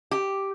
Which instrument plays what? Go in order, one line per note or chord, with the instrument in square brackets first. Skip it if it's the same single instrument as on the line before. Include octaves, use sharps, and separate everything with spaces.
[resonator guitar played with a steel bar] G4